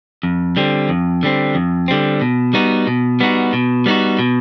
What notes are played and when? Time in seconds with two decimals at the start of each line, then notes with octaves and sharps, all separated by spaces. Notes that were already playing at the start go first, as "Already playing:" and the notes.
0.23 F2
0.57 D3 G3 C4
0.89 F2
1.23 D3 G3 C4
1.55 F2
1.88 D3 G3 C4
2.21 B2
2.54 G3 B3 D#4 F#4
2.87 B2
3.20 G3 B3 D#4 F#4
3.53 B2
3.86 G3 B3 D#4 F#4
4.19 B2